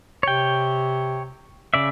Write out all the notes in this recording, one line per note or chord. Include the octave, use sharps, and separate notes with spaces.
C3 C#5 G5
C#3 D5 E5